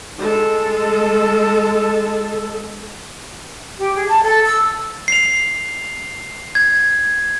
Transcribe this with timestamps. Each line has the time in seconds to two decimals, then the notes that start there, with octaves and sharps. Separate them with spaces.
0.18 G#3 A4
3.79 G4
3.96 G#4
4.09 A5
4.23 A4
4.46 E6
5.08 C7 F7
6.55 G#6